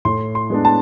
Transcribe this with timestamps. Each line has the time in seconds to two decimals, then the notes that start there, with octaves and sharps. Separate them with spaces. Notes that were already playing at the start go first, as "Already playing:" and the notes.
0.05 A2 C6
0.35 C6
0.50 G#3 B3 D4
0.65 A5